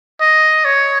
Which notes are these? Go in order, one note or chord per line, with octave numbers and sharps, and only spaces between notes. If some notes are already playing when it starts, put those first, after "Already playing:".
D#5
C#5